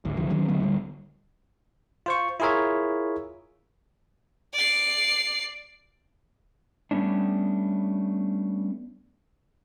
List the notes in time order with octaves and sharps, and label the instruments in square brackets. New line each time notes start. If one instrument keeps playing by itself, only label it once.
[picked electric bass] G#1 D2
C2 D3 F3
D#3 F#3 C#4
D3 F#3 A3 B3
D1 D3 G3
[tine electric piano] F4 C5 C#6
E4 F4 G#4 A#4 C#5 E5
[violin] D5 C7
[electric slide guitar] G3 A3 B3 C#4 D4